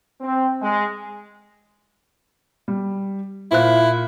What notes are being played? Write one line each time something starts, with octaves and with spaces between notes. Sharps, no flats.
C4
G#3
G3
A#2 E4 C5 F#6